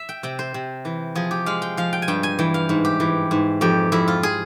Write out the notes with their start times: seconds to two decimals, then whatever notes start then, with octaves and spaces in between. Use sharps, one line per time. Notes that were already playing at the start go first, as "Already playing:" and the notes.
Already playing: E5
0.09 G5
0.23 C3 G5
0.39 C5
0.54 C3
0.85 E3
1.15 F3 G#4
1.31 G4
1.46 G#3 F5
1.62 G5
1.77 F3 F5
1.93 G5
2.02 G#5
2.08 G2 G5
2.23 G#5
2.39 E3 G5
2.54 F5
2.69 G#2
2.85 G4
3.00 E3
3.31 G#2
3.61 F2 G4
3.92 F2 E4
4.08 F4
4.23 G#4